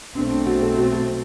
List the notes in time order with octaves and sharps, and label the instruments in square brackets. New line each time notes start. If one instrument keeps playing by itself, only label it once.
[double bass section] B1 B2 A3 C4 [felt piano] D4
[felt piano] D4
F#4
A4
F#4
F#4